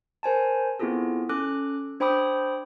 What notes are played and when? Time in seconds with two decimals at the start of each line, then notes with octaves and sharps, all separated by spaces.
0.23 A#4 C5 G#5 A5
0.79 B3 C4 E4 F4 G#4 A4
1.29 C#4 A4 D6 F#6
2.00 D4 C5 G5 B5 D6 D#6